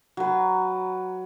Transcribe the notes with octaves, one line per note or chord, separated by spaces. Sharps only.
F#3 B4